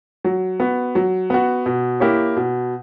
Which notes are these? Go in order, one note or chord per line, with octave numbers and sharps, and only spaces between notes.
F#3
B3 F#4
F#3
B3 F#4
B2
A#3 E4 G4 C#5
B2